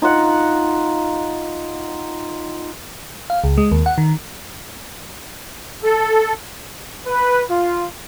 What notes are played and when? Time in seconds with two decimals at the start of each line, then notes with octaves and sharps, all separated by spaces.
0.02 D#4 F4 F#5
3.30 F5
3.44 C#2
3.58 G#3
3.71 D#2
3.86 F#5
3.98 D#3
5.83 A4
7.07 B4
7.49 F4